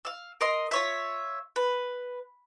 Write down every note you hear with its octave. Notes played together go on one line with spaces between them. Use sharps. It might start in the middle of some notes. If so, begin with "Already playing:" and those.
F5 E6
A#4 D#5 C6
F4 C#5 E5
B4